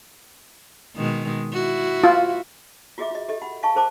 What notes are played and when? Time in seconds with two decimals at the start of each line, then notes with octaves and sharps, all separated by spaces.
0.96 B2 D#3 G#3
1.53 E4 F#4
2.04 F4
2.98 F4 F#4 G#4 D#5 E5 D6
3.11 F4 D#5
3.28 G4 A4 D#5
3.42 F#5 B5
3.63 D#5 F5 G#5 A5 C#6
3.75 G#4 A#4 C5 A5 D6